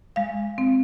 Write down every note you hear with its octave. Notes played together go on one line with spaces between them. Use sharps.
G#3 F5
C4